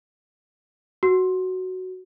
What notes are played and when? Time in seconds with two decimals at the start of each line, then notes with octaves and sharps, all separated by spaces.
1.03 F#4